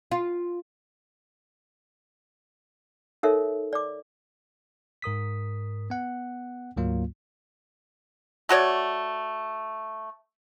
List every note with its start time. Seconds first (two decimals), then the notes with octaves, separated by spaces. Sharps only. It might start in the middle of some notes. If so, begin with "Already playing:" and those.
0.11 F4
3.23 D#4 A4 A#4 C#5 E5
3.73 D5 D6
5.02 G#2 A#4 D#6 B6
5.90 B3 F#5
6.76 D2 G#2 F#3 A#3 F4
8.49 A3 F#4 C#5 D5